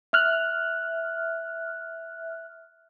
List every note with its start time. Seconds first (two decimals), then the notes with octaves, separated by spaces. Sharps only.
0.13 E5 F6 F#6